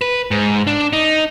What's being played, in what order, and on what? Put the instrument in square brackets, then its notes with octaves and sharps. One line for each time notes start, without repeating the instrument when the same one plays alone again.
[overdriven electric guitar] B4
G#2
D4
D#4